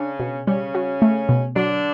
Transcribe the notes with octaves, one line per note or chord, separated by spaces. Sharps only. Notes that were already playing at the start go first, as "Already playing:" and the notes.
Already playing: C#3 C#4 D4
B2
C#3 G3 C#4
F#4
A3
B2
D3 F#3 D4